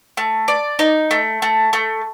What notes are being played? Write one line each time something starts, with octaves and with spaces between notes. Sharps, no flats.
A3
D5
D#4
A3
A3
A3